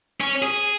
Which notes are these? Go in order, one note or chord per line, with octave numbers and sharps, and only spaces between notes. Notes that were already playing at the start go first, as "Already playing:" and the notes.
C#4
G#4